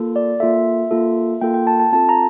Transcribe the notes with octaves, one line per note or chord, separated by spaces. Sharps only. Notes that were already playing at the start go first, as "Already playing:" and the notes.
Already playing: A#3 F4 A4
D5
A#3 F4 A4 E5
A#3 F4 A4
A#3 F4 A4 G5
G5
A5
A5
C4 F4 A4 A5
A#5